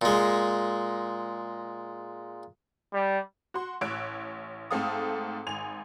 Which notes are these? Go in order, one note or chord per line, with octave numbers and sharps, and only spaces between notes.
A#2 G#3
G3
F#4 C6
A1 C#5 E6 F#6 D7
G#2 A3 C4 A4 F5 D#6
G#1 G#5 F7